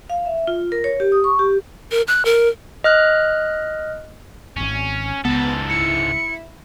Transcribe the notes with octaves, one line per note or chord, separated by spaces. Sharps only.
F5
E5
F4
A#4
C#5
G4
D#6
C#6
G4
A#4
F#6
A#4
D#5 F6 F#6
D1 G#1 C#4
C#2 G#2 B3 A4
E4 C#7